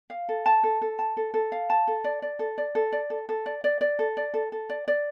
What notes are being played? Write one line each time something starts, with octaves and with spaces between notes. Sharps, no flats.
F5
A4
A5
A4
A4
A5
A4
A4
F5
A5
A4
D5
D5
A4
D5
A4
D5
A4
A4
D5
D5
D5
A4
D5
A4
A4
D5
D5